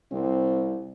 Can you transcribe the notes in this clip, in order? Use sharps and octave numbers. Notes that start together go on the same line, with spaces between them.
C2 C4